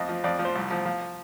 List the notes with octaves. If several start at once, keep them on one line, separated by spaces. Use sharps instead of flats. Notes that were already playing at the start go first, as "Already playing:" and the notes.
Already playing: F2 D#5
F3
F2 D5
F3
C5
C2
F3
F3